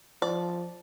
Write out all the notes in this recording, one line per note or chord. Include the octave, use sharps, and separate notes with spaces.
F3 D5